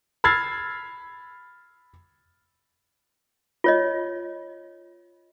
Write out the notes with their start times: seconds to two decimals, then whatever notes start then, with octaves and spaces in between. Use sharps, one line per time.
0.24 B5 E6 F6 G#6 A6 C7
3.64 F4 C#5 D#5